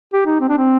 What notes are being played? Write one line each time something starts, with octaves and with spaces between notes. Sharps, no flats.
G4
D#4
C4
D4
C4